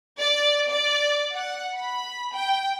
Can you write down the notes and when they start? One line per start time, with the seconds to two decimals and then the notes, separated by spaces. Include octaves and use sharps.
0.21 D5
0.70 D5
1.35 F#5
1.77 B5
2.35 G5